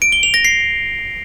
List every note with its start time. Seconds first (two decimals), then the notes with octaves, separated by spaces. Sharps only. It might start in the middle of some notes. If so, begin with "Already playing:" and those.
0.02 D7
0.12 G7
0.23 F7
0.34 A#6
0.45 C7